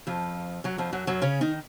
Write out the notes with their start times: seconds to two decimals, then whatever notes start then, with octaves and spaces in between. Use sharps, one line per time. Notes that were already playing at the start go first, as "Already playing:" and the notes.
0.07 F2 F3
0.64 F#2 F#3
0.78 F2 F3
0.93 F#2 F#3
1.07 F#2 F#3
1.22 C#3 C#4
1.41 D#3 D#4